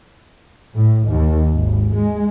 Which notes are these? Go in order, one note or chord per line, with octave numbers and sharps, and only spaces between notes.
A2
D#2
G#1
G#3